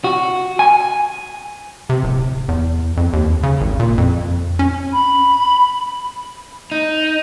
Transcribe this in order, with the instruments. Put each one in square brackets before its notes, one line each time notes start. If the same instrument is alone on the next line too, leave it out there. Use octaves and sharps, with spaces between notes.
[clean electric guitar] F#4
G#5
[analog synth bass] C3
D1
E2
F2
D#2
C#3
G#1
A#2
F2
C#4
[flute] B5
[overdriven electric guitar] D#4